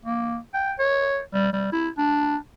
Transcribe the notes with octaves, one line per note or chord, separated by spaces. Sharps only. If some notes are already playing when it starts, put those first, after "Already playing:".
A#3
G5
C#5
G3
G3
E4
D4